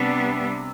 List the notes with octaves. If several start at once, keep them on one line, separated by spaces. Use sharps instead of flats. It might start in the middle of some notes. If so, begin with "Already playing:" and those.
Already playing: C3 G3 B3 D4